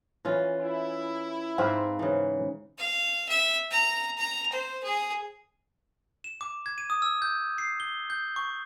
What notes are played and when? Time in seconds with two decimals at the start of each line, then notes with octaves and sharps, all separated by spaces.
0.25 E3 C#4 F4
0.60 E4
1.58 G#2 C4 B4 C5 F5
1.99 C#3 E3
2.78 F5
3.28 E5
3.71 A#5
4.17 A#5
4.52 C5
4.83 G#4
6.24 E7
6.41 D6
6.66 G#6
6.78 D#7
6.90 D#6
7.02 E6
7.22 G6
7.58 C7
7.80 G7
8.10 G6
8.36 C#6